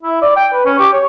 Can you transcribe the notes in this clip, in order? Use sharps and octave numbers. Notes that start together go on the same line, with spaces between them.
E4
D5
G5
B4
C#4
G4
C#5